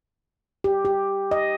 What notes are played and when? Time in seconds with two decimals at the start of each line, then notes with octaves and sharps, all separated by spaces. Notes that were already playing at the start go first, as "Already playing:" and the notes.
0.64 G4
0.85 G4
1.31 D#5